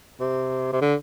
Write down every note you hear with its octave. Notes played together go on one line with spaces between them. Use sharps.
C3
C3
D3